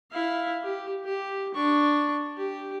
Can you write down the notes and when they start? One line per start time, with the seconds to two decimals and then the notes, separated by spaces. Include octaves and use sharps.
0.12 E4 F5
0.63 G4
1.04 G4
1.54 D4 C#6
2.37 G4